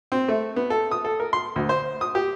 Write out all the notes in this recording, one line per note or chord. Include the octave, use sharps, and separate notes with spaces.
C4
A3
B3
A4
D#6
A4
A#4
C6
D2
C5
D#6
G4